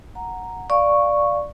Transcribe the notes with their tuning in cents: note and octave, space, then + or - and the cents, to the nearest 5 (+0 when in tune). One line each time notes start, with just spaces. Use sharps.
F#5 -5 A#5 +0
D5 +0 F5 +0 C#6 +0